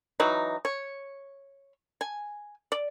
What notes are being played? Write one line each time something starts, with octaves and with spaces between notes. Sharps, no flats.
E3 F#3 D#4
C#5
G#5
D5